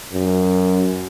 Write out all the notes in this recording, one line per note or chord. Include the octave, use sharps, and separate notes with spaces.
F#2